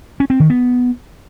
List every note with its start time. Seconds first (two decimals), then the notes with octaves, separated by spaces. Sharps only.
0.20 C#4
0.30 C4
0.40 D#3
0.50 B3